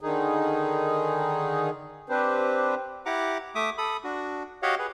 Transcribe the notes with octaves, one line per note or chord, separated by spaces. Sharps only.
D3 D#3 D#4 G#4
C4 D4 G4 B4 C5
E4 G4 F#5 A#5 D6
A3 E5 D6 D#6
A4 B5 D#6
D4 F#4
F#4 G4 C#5 D#5 F5 F#5
G#4 B4